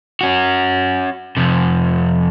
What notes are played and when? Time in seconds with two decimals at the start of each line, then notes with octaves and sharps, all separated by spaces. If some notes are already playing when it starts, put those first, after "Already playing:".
0.21 C#4 F#4
1.37 F2 C3